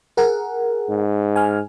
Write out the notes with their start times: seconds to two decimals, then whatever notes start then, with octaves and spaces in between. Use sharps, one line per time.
0.17 G#4 A#4 F#5
0.89 G#2
1.36 G#5 F6